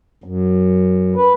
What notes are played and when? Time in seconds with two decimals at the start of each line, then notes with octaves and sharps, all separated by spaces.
0.24 F#2
1.16 B4